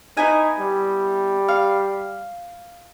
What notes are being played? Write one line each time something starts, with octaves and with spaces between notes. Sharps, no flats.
B3 D#4 E4 G#5
G3
F5